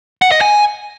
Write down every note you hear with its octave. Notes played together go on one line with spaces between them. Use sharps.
F#5
D#5
G#5